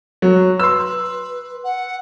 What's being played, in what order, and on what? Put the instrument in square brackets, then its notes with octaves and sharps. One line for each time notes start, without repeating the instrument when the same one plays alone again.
[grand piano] F#3
[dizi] B4 [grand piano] C6 E6
[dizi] F#5